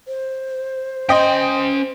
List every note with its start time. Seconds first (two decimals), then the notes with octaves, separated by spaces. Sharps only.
0.08 C5
1.09 C#4 D#5 G5 C6